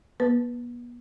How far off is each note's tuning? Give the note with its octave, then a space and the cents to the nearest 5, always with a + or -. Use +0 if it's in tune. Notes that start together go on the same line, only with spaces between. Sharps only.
B3 -40 B4 +0